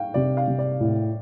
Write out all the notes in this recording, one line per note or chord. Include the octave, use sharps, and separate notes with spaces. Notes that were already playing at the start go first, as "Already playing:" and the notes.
Already playing: F5 G5
C3 D5
F5
C3
D5
A2